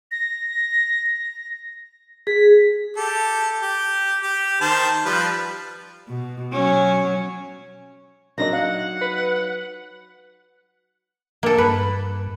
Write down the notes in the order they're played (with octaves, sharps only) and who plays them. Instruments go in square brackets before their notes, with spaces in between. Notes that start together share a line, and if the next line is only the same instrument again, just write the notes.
[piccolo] A#6
[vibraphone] G#4 [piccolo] B6
[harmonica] G4 A4
G4
G4
D#3 C5 A5
F3 G3 B4
[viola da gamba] B2
F#3 C#4
[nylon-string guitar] F#3 D#4 [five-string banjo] A#3 D4 D#5 [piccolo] A#6
[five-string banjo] F5 [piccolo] F#5
[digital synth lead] B4
[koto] A#3 A4
[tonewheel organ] G2 [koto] B4